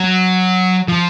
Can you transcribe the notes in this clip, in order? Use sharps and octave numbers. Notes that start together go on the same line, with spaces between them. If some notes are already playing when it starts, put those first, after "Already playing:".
Already playing: F#3
F3